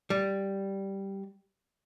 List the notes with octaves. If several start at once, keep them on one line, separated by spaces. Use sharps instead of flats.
G3